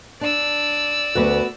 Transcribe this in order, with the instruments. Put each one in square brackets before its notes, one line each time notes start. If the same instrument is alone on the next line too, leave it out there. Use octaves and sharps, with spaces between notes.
[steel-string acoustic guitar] D4 [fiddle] D5 E6
[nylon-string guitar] D2 B4 [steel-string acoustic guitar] B3 F#4